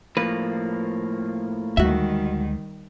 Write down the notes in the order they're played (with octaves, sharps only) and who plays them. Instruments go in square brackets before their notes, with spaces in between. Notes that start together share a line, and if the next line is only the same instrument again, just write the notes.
[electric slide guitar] A2 F3 A#3 [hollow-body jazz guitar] B4
[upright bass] D2 G#3 [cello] D#3 G3 [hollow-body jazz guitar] F#4 E5